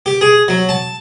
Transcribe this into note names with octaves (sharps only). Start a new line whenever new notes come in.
G4
G#4
F#3
A5